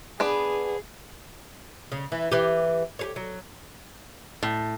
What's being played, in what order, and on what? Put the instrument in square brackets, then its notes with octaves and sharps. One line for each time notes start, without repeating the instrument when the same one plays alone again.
[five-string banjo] B3 D4 B4 [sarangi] G#4
[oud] C#3
E3
E3 G4
G4 G#4 C#5
F#3
[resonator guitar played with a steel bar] A2